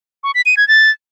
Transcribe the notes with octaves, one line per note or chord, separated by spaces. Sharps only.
C#6
B6
D#7
G#6
A6